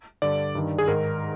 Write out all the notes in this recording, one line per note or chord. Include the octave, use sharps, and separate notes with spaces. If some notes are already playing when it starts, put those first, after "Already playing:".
G2 D3 D5
G2 D#3
G#4
G#2 D#3 A#4